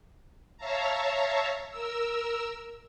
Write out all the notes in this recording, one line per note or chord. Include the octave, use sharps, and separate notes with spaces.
C#5 E5 F5 A5 A#5
A#4 E6